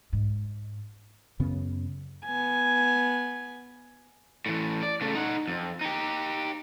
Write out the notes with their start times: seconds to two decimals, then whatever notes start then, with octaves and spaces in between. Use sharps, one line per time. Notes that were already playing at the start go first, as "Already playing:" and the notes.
0.13 G#2
1.40 F#2 C#3 B3 C#4
2.25 B3 G#5
4.46 A2 E3
4.82 D5
5.01 C#3 A3
5.15 D#4 F#5
5.48 F2
5.81 D#4 G4